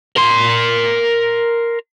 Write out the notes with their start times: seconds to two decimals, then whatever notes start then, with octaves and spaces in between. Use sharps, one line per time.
0.17 A#4 C6